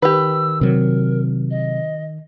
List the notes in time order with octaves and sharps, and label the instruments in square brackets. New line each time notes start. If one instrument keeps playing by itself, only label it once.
[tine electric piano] D#3 [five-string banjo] G4 B4 [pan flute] E6
[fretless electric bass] C3 F#3 [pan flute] A#4
[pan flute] D#5